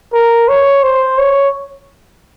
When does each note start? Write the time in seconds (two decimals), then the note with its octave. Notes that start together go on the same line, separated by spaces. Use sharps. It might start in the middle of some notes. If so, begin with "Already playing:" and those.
0.13 A#4
0.48 C#5
0.83 C5
1.18 C#5